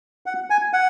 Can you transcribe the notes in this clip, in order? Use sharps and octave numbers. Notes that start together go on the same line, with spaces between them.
F#5
G#5
F#5